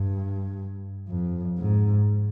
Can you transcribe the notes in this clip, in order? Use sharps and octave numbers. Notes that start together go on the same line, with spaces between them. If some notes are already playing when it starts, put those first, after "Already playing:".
Already playing: G2
F2
G#2